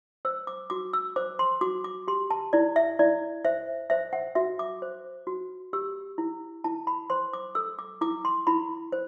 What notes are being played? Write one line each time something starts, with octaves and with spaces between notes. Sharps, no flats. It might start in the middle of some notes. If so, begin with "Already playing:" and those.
C5 E6
D6
F#4 D6
E6
C5 D6
C6
F#4 D6
D6
G4 C6
A5
E4 D5
E5
E4 D5
C5 E5
C5 E5
F#5
F#4 E5
D6
C5
F#4
G4 E6
E4
E4 A5
B5
C5 C6
D6
A4 E6
D6
E4 D6
C6
E4 B5
C5